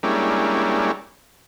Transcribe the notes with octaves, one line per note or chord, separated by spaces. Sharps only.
G3 G#3 A#3 C#4 D4 E4